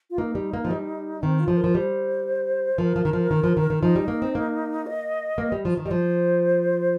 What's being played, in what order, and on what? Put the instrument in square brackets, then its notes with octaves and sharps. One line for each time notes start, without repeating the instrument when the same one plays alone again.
[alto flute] F4
[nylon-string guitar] A#3 [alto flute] D#4
[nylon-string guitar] G3
A#3
F3
G3
[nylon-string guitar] D#3 [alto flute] C4
[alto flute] F4
[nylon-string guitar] F3 [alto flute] C5
[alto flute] A#4
[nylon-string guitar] F3
[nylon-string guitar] G3 [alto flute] C5
[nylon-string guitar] F3 [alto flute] A#4
[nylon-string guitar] F3
D#3
F3
D#3
F3
D#3
D#3
[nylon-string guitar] F3 [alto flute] D#4
[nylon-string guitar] G3
A#3
C4
A#3
[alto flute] D#5
[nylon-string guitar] A#3
G3
F3
D#3
[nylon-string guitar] G3 [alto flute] D#5
[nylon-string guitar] F3 [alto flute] C5